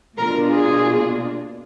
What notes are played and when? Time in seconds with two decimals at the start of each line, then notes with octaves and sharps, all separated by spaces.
0.17 B2 A#3 D4 F4 A#4
0.50 G#4